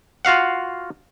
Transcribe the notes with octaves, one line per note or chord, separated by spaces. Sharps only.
F4 F#4 F5 F#5